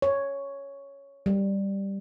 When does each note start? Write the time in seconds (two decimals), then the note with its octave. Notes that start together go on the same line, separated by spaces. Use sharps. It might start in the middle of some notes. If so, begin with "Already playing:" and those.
0.02 C#5
1.26 G3